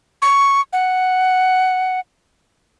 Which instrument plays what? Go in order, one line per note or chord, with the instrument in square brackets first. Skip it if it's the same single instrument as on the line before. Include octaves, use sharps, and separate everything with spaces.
[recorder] C#6
F#5